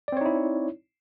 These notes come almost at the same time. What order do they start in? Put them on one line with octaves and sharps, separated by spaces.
D5 C4 C#5 D#4 E4